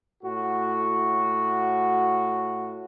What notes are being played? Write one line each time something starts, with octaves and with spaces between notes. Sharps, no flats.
A2 F#4